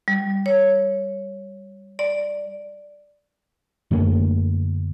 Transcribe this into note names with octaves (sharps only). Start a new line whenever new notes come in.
G3
C#5
D5
F#2 D3 A3 A#3